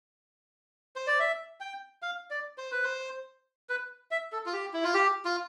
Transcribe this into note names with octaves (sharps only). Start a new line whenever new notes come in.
C5
D5
E5
G5
F5
D5
C5
B4
C5
B4
E5
A4
F4
G4
E4
F4
G4
F4